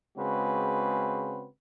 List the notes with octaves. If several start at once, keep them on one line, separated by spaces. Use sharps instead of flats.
C#3 G#3 C4 F#4 B4